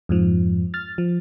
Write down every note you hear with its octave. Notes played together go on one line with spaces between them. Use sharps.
F2 G#2 F3
F6 A6
F3